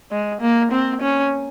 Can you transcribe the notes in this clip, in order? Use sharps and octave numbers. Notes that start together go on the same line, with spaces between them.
G#3
A#3
C4
C#4